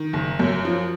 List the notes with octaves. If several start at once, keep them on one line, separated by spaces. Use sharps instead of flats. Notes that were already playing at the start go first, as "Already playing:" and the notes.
Already playing: D#3
F#1
F#2
F3